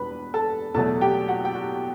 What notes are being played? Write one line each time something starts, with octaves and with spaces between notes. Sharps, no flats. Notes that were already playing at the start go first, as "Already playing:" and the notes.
Already playing: E1 E2 B2 G3 D4 B4 B5
A4 A5
E2 B2 F#3 A3 A4 A5
G4 G5
F#4 F#5
G5
F#4 F#5